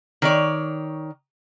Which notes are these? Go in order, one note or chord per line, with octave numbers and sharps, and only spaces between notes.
D#3 C#5 D5